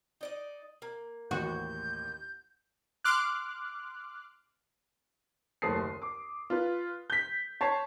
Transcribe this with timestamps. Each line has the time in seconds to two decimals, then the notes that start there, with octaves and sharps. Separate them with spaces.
0.21 D#4 D5 D#5
0.82 A#3
1.31 A1 D#2 F#4 G6
3.04 C6 D6 F6 F#6
5.62 F#1 D#2 A3 A5 D#6 C7
5.78 C6
6.02 D6
6.50 F4 B4
7.10 G6 B6
7.61 C#5 A5 C7